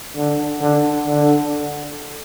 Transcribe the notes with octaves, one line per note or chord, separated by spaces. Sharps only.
D3
D3
D3